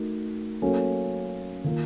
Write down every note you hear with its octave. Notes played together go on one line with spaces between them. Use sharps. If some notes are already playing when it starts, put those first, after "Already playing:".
Already playing: A3 D#4 F#4 A#4
F#3 A#3 C#4 A4
D#3 A#3 F4 A#4